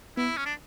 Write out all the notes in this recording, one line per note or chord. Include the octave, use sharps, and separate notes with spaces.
B3 E4
C#4
D4